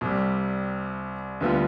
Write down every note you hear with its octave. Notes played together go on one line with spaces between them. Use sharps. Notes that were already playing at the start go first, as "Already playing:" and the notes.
C2 C3 G3
D2 D3 G3 B3 F4